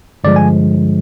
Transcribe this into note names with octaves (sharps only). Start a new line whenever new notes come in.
G2 D3 F3 G#3 D5
G#5